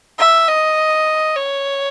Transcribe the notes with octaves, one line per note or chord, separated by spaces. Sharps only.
E5
D#5
C#5